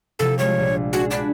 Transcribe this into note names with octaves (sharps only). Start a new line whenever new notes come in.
C3 F3 E4 A4
G3 G#3 F4 C#5
A#1
D4 F#4 G#4
D4 F#4 B5